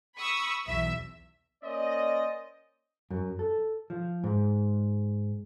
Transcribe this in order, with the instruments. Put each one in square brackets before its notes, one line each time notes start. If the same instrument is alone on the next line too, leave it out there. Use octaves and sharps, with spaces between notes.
[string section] B5 C#6 D#6 E6
B1 E2 E5 E6
[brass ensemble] A#3 C#4 C5 D5 D#5
[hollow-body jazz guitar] F#2
A4
F3
G#2